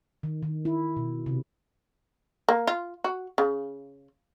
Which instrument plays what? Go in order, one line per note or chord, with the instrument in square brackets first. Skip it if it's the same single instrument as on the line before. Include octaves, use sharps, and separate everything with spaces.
[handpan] D#3
D#3
E4
B2
C3
[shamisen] A#3
F4
F#4
C#3